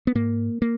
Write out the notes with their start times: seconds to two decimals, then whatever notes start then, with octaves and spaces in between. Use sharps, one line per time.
0.07 B3
0.15 G#2 A#3
0.62 A#3